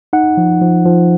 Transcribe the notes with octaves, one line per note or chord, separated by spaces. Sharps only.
D#4 F#5
F3
F3
F3